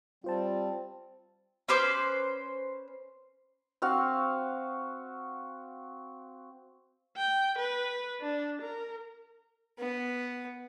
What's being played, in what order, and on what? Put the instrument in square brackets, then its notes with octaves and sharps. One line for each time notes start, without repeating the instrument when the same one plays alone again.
[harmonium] G3 C4 [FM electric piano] F4 C5 A5
[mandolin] C#4 B4 C5 D6
[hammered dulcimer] C4 F#4 F5
[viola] G5
B4
D4
A#4
[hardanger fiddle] B3